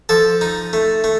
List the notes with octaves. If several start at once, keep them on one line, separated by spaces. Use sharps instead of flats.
F3 A4
D#4
A3
A3